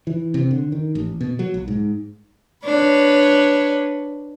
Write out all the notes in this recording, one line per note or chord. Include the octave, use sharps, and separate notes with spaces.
E3
C3
D3
D#3
A1
B2
F#3
B1
G#2
D4 B4 C#5